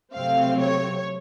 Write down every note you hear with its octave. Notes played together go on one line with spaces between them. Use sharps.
C3 F#3 A3 C4 F5
C#5